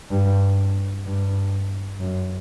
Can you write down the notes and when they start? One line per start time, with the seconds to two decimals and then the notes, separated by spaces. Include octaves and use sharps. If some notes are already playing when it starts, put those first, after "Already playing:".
0.11 G2
1.06 G2
2.00 F#2